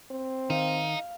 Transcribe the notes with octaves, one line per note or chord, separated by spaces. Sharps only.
C4
D#3 D#4 F5